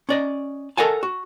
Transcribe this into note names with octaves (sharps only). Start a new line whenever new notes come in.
C#4 D5 D#5
A4 A#4 D#5 F#5 G#5 A5
F#4